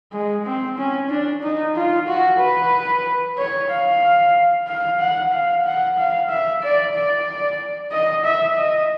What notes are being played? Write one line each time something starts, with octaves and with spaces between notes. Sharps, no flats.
G#3
C4
C#4
D4
D#4
F4
F#4
B4
C#5
F5
F5
F#5
F5
F#5
F5
E5
D5
D5
D#5
E5
D#5